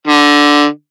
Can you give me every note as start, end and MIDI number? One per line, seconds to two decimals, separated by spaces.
0.07 0.65 50